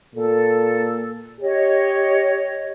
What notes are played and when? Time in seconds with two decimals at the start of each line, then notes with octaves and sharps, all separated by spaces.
0.15 A#2 A4
1.41 G4 C#5 D#5